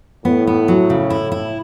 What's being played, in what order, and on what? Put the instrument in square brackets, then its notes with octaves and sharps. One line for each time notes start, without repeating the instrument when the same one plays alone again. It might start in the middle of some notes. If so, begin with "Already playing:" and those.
[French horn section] A2 [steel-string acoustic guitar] B3
[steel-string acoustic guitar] B3
F#3
C#3
E4
E4